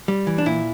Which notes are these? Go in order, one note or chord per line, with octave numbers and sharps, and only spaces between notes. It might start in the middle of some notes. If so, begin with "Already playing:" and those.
G3
E3
D4
A#2 E4